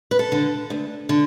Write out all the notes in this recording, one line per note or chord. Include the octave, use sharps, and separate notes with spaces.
B4
A4
D3
D2
D3